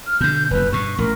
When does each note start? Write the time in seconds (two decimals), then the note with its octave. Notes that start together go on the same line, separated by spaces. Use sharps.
0.07 F6
0.21 B2 D3 G6
0.51 F#1 E2 B4
0.72 G2 B2 C#6
0.98 A1 A#4